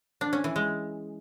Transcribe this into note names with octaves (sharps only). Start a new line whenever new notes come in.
D4
C#4
E3
G#3